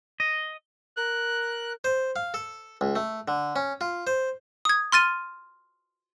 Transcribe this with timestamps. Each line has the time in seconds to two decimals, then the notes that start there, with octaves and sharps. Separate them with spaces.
0.20 D#5
0.97 A#4 F#6
1.84 C5
2.16 F5
2.34 A4
2.81 C#2
2.96 A3
3.28 D3
3.56 C#4
3.81 F4
4.07 C5
4.65 D#6 G#6
4.92 C6 F6 A6 D#7